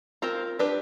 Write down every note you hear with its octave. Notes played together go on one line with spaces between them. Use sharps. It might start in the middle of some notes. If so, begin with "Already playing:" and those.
C4 F4 A#4
D4 G4 B4